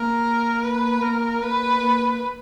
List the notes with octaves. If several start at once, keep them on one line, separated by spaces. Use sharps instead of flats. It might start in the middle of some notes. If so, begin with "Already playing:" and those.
Already playing: A#3 A#4
B4
A#3 A#4
A#3 B4
A#3